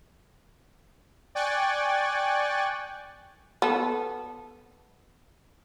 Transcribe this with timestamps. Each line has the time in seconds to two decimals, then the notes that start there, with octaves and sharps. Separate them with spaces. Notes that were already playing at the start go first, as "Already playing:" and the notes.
1.35 D5 G5 G#5 C#6 F#6 A6
3.62 B3 A4